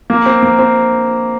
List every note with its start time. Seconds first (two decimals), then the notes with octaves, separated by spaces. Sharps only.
0.10 A#3
0.26 C4
0.42 A#3
0.59 C4